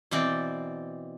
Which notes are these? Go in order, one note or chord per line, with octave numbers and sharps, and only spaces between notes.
B2 E3 C4 D5